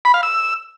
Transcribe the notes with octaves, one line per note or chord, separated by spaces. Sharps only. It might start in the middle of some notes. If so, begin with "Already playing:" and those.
B5
F5
E6